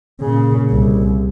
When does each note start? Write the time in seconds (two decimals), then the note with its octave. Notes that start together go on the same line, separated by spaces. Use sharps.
0.21 A#2 C#3
0.71 C2